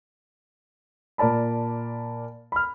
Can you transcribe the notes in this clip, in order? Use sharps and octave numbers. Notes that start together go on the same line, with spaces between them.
A#2 A#4 D5 A5 B5
B5 F6